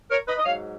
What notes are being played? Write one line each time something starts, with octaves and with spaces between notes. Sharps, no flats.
A#4 C#5
B4 D#5
D#5
G#2 F#3 C#5 F5